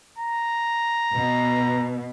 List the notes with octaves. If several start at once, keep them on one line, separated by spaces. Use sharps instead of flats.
A#5
B2